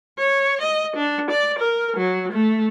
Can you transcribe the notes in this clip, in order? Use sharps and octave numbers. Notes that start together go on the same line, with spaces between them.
C#5
D#5
D4
D5
A#4
F#3
A3